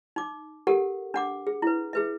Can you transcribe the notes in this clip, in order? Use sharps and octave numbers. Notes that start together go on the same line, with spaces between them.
D#4 D6
G4 A4 A#4 F#5
D4 F#5 D6
G#4
E4 B4
G#4 B4 E5